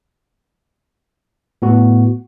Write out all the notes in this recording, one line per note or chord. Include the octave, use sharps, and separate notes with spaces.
A2 B3 F#4